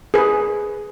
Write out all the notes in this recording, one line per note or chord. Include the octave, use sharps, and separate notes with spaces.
G#4 B4